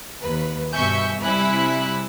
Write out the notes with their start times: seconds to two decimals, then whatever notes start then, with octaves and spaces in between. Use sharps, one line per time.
0.20 D#2 B4
0.73 G2 B2 E5 G#5 C#6 G6
1.21 C3 G3 E4 G#5 B5 F#6